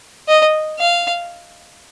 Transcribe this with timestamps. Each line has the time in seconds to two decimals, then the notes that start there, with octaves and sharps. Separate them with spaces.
0.28 D#5
0.79 F5